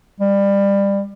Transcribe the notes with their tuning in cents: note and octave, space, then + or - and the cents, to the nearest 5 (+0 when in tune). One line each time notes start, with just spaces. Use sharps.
G3 +20